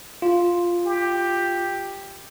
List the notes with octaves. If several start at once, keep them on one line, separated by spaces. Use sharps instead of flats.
F4
G4